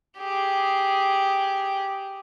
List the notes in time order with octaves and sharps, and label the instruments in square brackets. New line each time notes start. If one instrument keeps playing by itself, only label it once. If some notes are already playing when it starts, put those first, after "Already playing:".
[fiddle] G4 G#4